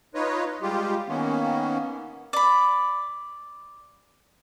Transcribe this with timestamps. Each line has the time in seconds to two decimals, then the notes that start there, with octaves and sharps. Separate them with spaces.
0.15 D#4 F4 B4 C#5 D#5
0.62 G3 G#3 F4 G4
1.08 D#3 A#3 B3 C#4
2.33 D5 B5